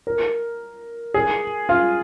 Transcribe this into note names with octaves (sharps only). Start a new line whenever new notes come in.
A#4
G#4
F4